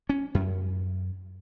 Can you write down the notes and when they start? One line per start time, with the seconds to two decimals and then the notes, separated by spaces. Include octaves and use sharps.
0.09 C#4
0.35 F#2